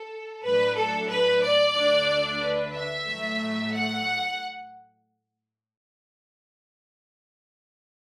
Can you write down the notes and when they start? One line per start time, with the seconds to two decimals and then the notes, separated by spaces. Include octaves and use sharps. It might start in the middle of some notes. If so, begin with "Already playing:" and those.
Already playing: A4
0.44 A2 F#3 D4 B4
0.76 A4
1.09 B4
1.42 D5
1.75 D2 D3 A3 D4
2.40 B4
2.73 E5
3.06 A2 F#3 A3
3.72 F#5